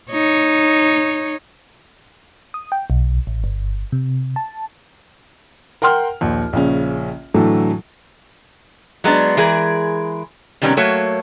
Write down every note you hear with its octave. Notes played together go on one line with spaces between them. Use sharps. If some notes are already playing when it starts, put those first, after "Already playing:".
D#4 C#5
D#6
G5
B1
A1
G1
C3
A5
A#4 F#5 G5 C6 F6
A#1 D#2
A#1 C#3 C#4
A2 D3 E3 F#3 A3
F#3 G#3 B3 D4
E3 G#3 G#4 A#4
C3 D#3 G3 B3 C#4
F#3 A3 A#3 F#4 C#5